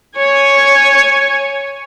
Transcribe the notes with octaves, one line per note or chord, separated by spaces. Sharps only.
C#5 G#5